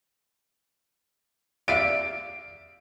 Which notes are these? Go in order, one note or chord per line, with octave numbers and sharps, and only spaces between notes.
D5 E5 F5 D7